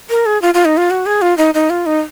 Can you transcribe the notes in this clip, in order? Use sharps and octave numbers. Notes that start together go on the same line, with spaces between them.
A#4
G#4
F4
F4
D#4
F4
F#4
G#4
F4
D#4
D#4
F4
D#4